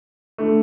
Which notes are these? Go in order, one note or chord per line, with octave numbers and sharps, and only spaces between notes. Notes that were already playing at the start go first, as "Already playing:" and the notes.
D3 A3